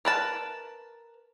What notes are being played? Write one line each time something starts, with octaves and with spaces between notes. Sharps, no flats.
A#4 B4 A5